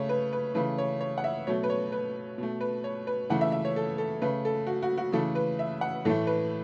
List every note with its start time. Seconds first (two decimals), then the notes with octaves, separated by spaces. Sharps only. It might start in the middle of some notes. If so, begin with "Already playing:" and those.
Already playing: C#3 A3 C#5
0.09 B4
0.33 B4
0.55 C#3 E3 A3 B4
0.78 C#5
1.01 C#5
1.18 F#5
1.24 E5
1.47 B2 F#3 A3 C#5
1.63 B4
1.70 C#5
1.92 B4
2.38 B2 A3
2.61 B4
2.84 C#5
3.07 B4
3.30 C#3 E3 A3 F#5
3.41 E5
3.52 E5
3.65 C#5
3.76 A4
3.98 A4
4.22 C#3 A3 B4
4.45 A4
4.67 F#4
4.83 F#4
4.98 F#4
5.12 C#3 E3 A3 A4
5.35 B4
5.59 E5
5.81 F#5
6.05 A2 E3 A3 A4
6.27 B4